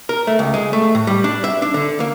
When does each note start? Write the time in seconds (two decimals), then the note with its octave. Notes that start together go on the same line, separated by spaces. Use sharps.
0.09 A#4
0.27 A3
0.39 C#2
0.54 G#3
0.73 A3
0.95 A2
1.07 G3
1.24 D4
1.44 E5
1.62 D4
1.74 D3
2.00 A#3